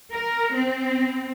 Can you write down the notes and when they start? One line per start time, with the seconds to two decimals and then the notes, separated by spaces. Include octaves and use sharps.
0.12 A#4
0.53 C4